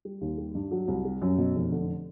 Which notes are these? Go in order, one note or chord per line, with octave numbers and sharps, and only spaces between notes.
G3
D#2
G3
G2
F#3
C2
G3
F#2
B2
F1
D3